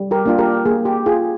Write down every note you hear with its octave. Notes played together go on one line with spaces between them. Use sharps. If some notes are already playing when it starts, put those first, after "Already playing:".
Already playing: G3
G4 A#4
A#3 D4 F4
G4 A#4
A#3 G#4
G4
F4 G#4